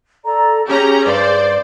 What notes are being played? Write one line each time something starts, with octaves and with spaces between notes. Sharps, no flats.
A4 D5 A#5
C#4 G4 G#4 A#5
G2 C5 D5